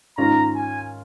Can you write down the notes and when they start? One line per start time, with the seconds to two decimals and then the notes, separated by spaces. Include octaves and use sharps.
0.18 G#2 D#3 C#4 F4 A#5
0.55 G#5